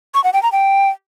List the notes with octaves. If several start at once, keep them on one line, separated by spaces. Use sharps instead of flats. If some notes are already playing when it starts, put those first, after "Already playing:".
C#6
F#5
G5
A#5
G5